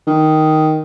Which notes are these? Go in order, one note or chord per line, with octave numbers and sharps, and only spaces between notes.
D#3